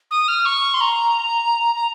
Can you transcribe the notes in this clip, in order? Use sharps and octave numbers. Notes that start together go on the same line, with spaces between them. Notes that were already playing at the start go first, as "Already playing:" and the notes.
D#6
F6
C#6
C6
A#5
A#5